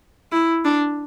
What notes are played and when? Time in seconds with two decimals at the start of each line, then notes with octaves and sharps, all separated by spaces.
0.32 E4
0.65 D4